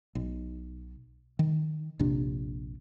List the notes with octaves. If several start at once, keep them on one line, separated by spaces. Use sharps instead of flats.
B1
D#3
A#1 F2 C3 D4